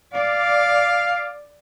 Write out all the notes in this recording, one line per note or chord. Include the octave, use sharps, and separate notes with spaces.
D5 F5